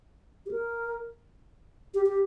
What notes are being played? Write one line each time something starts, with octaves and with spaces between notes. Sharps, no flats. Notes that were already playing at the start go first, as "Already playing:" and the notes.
G4
A#4
G4
G4